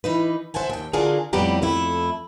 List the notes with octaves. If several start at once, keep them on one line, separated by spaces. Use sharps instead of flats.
E3 D#4 B4
C5 E5 F#5 G#5 A5
D#2 G5
D3 D4 F4 F#4 G#4 A#4
F2 A2 G3 B3 G4 A#5
F2 A3 E4